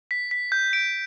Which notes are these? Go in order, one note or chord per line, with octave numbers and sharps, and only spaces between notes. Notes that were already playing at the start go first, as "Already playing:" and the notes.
B6
B6
G6
D7